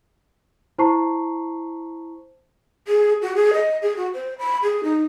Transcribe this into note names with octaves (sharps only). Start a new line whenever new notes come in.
E4 C5 A5 A#5 C#6 C7
G#4
F#4
G#4
D#5
G#4
F#4
C5
B5
G#4
D#4